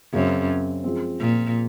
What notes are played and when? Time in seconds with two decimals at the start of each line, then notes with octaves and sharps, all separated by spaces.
0.13 F#2 C#3 F#3 C4
0.84 F3 G#3 C4
1.20 A#2